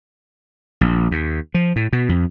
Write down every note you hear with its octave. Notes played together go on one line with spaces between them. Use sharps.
A#1
D#2
F3
A2
B2
F2